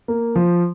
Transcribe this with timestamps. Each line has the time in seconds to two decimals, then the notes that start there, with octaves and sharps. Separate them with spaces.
0.08 A#3
0.36 F3